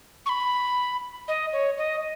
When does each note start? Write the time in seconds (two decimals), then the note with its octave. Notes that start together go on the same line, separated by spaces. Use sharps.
0.26 C#6
0.29 B5
1.28 D#5
1.53 C#5
1.78 D#5